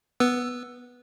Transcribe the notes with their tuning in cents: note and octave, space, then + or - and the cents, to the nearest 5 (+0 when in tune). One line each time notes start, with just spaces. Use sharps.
B3 +0 B4 -10 E6 +5